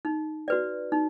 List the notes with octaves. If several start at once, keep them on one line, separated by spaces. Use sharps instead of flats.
D#4
F#4 B4 D5
D#4